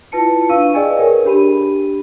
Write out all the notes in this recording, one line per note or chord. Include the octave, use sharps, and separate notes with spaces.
E4 F4 B4 A5 C#7
D4 F5 C#6 E6 D#7
G#4 B4 D5 D#5 G5 G#5
G#4 A#4 C#5
D4 G4 B5 D#7